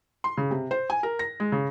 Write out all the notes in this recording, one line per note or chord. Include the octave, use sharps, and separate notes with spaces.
C6
C#3
C3
C5
G#5
A#4
A#6
G#3
C#3